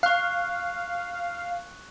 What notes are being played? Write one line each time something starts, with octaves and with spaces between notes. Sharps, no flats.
F5 C#6 F#6